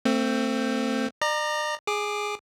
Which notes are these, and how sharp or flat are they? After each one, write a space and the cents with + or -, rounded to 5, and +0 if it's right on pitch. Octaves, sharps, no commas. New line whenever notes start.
A3 +30 C4 +0
D5 +40 A#5 +0
G#4 +0 D6 +20